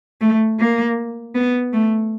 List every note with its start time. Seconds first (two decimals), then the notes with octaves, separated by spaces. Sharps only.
0.21 A3
0.59 A#3
1.35 B3
1.73 A3